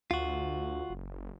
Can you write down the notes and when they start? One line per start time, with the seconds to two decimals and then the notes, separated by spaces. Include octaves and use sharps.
0.11 D2 F4 F#4
0.90 F#1